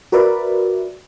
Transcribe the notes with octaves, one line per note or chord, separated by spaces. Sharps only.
F#4 A#4 B4 D5 E5